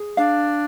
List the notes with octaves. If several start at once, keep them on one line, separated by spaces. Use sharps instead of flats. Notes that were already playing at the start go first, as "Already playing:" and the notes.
Already playing: G#4
D4 F5